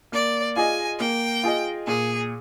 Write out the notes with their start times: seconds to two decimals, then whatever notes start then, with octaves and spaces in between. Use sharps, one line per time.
0.12 A#3 D5
0.56 F4 G#4 D#5 G#5
1.00 A#3 G5
1.43 F4 G#4 D#5
1.87 A#2 G#4